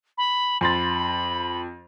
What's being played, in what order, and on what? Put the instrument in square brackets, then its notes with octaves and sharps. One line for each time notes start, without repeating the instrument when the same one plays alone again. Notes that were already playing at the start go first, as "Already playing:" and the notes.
[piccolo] B5
[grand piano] F2 C6 A6 [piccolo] B5